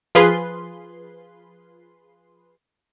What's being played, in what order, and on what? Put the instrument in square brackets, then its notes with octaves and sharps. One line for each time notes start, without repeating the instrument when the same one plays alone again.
[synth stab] F3 F4 G#4 B4 C6